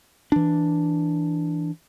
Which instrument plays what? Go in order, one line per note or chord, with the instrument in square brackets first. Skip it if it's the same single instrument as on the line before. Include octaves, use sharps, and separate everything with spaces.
[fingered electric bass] E3 D4